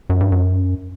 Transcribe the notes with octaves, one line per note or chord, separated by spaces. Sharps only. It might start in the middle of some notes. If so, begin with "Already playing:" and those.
F#2
G2
F#2